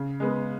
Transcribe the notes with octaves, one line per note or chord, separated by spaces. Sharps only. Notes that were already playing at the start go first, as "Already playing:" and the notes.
Already playing: C#3
G#3 B3